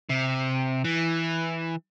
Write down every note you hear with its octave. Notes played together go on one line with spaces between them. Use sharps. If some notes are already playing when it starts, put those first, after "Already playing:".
C3
E3